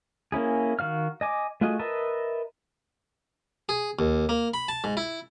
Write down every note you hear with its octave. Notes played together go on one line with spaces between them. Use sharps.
A#3 C#4 E4 G#4
D#3 F#4 F5 F6
D#5 G#5 D6
A3 F4 F#4 G#4 D#5
A#4 B4 D#5 E5 A5
G#4
D#2
A#3
B5
A5
G#2
E4